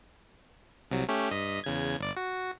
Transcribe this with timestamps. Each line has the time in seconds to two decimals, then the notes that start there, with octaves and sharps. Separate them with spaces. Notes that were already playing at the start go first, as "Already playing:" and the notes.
0.91 C2 C3 F#3
1.09 A3 C#4 G4
1.31 G2 D#5 B6
1.64 E2 C#3 G#6
1.99 G1 D5
2.17 F#4